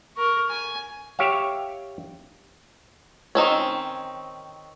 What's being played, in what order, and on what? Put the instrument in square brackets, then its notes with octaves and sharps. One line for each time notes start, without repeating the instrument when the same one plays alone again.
[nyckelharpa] A#4 C#6
G#5
[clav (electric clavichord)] G4 C#5 E5 F5
[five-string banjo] D#3 C4 C#4